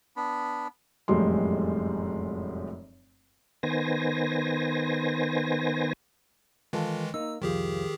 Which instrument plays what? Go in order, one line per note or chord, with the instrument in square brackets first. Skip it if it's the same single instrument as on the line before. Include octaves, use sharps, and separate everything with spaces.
[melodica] B3 D4 B5
[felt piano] F1 F#2 A2 G3 G#3 C6
[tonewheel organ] D#3 B3 C5 G#5 A#6
[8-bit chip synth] D#3 E3 G#3 [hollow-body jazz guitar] F4 A4
[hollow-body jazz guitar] A#3 D#4 [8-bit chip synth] E6
[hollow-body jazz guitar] C2 F2 F3 [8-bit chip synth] D#3 G4 G#4